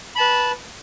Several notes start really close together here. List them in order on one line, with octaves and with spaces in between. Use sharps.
B5 A5 B4